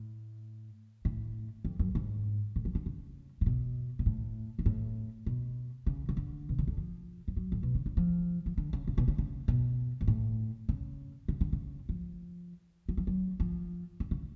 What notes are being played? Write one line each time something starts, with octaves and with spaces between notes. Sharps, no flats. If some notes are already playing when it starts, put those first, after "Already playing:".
Already playing: A2
A2
F2
F#2
G#2
A2
F3
D3
C#3
A2
B2
B2
A2
G#2
A2
B2
C#3
C#3
D3
B2
C#3
D3
F3
F3
F#3
A2
B2
C#3
D3
F3
F3
D3
C#3
C#3
B2
C#3
C#3
B2
G#2
A2
C#3
C#3
D3
C#3
F3
F#3
F3
F#3
F3
D3
C#3